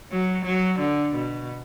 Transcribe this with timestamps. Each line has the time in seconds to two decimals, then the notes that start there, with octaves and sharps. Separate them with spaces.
0.12 F#3
0.45 F#3
0.79 D3
1.15 B2